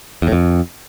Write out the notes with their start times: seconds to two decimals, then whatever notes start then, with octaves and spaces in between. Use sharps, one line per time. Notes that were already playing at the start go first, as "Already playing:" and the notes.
0.22 E2
0.27 A2
0.32 F2